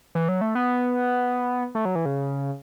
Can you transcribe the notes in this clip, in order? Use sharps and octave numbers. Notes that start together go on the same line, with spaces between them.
E3
F#3
A3
B3
A3
F#3
E3
C#3